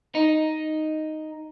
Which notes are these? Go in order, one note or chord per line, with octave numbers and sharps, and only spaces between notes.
D#4